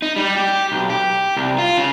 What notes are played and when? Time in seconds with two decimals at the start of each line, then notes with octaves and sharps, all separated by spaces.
0.02 D#4
0.16 G3
0.37 G4
0.72 B1
0.90 G4
1.36 C2
1.58 F4
1.77 C#3